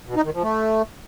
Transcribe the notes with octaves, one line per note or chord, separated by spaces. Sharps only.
B2
D#4
D#3
F3
A3